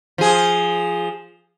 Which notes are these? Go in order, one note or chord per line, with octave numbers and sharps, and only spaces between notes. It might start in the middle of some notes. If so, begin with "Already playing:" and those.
F3 G#4